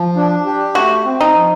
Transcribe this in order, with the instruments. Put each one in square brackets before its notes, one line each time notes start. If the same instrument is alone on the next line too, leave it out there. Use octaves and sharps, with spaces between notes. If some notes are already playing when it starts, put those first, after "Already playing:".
Already playing: [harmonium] F3
D4
G4
[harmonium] A3 [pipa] F#4
[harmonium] C4
[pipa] D#4
[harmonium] F3